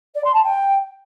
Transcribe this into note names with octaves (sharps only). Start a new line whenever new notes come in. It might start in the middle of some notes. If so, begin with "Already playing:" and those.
D5
C6
A5
G5